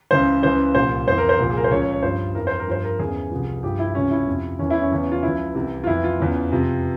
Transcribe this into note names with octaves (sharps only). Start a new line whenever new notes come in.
C#2 C#3 E3 C5
C#2 C#3 E3 C5
C2 A#2 F3 C5
F2 E3 C5
A#4
C5
C2 A#2 F3
G#4
A#4
C5
C#2 C#3 F3 C#5
C#5
C#5
G2 F3 C5
F2 E3 A#4
C5
A#4
G2 F3 C5
A#4
E2 C#3 E3 G#4
C2 C3 F3
G2 F3 G4
E4
C#2 C3 F3 C#4
E4
F2 C3 F3
E2 E3 C#4
E4
C#4
E2 C#3 E3
F4
C#2 C#3 F3 E4
C2 C3 E3
F4
F2 E3 E4
F4
E2 C#3 E3
F2 C3 F3